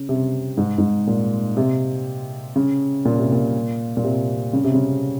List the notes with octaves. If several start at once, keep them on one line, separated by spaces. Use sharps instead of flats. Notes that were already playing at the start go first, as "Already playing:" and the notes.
Already playing: C#3
C3
G#2
G#2
A#2
C3
C#3
A#2
C3
A#2
A#2
C3
C#3
C3
C#3